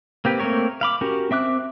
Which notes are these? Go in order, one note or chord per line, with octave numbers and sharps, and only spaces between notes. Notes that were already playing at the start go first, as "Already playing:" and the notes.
A#3 C4 G4 B4
A3 A#3 C4 A#4 C#5
F5 B5 D6
C#4 F#4 G4 A#4
C4 E5 D6 F#6